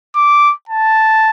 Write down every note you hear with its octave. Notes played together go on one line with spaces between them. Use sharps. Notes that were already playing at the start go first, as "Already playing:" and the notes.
D6
A5